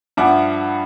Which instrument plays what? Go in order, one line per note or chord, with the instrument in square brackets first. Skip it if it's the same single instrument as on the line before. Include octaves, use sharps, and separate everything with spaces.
[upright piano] G2 F3 E5 F#5 D6